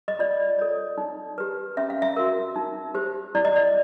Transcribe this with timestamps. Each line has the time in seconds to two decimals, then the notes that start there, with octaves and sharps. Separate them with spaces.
0.08 D#5
0.19 F4 D5
0.59 A4 C#5
0.98 D#4
1.38 G4 B4
1.77 C#4 E5
1.90 F5
2.02 E5
2.17 F#4 A#4
2.56 D#4
2.94 G4 C5
3.35 E4 D5
3.45 D#5
3.56 D5